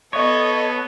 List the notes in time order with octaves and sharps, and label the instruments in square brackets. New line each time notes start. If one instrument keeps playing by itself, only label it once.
[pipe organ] B3 [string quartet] A4 [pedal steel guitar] C#5 [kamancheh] D#5